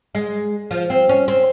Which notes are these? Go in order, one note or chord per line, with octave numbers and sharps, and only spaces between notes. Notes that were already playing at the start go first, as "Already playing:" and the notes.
G#3
F3
C4
C#4
C4